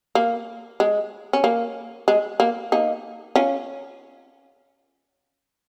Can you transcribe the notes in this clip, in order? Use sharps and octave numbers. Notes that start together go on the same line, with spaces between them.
A#3
G#3
C#4
A#3
G#3
A#3
A#3 D#4
C#4 F4